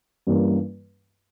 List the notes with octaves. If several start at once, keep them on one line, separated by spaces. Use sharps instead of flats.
G2 E3 G3 A#3 C#4